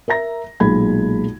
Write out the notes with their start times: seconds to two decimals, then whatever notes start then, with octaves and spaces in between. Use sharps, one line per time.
0.08 A#4 E5 A#5 A#6
0.60 B1 A#2 G#3 B5 G#6